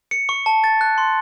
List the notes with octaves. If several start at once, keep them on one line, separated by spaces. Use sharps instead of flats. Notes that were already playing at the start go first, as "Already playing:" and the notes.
C#7
C#6
A5
A6
F#6
C6